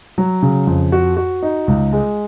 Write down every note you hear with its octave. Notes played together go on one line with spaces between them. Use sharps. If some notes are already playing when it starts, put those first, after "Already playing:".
F#3
C#3
F2
F#4
F#4
D#4
C#2
G#3